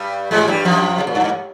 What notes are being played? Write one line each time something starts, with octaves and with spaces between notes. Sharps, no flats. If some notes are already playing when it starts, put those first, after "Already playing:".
Already playing: G2 G3
G#2 G#3
G2 G3
F2 F3
C#3
A#2
G2
G#2